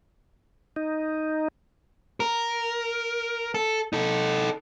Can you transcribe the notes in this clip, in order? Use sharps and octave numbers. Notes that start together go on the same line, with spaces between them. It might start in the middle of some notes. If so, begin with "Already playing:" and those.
D#4
A#4
A4
D#4 A4